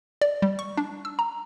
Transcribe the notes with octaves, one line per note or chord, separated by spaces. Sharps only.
D5
G3
C#6
D4
E6
A#5